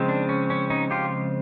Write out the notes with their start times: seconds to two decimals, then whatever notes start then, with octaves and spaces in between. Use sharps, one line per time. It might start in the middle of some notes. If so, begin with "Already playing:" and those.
Already playing: C#3 F3 G#3 C4
0.08 D4
0.29 C#4
0.50 C#4
0.70 C#4 D#4
0.91 F4 G4